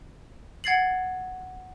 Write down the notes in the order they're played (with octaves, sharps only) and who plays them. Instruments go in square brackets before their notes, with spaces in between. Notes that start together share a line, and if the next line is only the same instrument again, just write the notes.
[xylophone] F#5 G#6 A6 C7 F#7